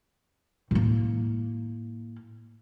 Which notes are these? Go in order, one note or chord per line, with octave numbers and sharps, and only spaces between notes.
A2 A#3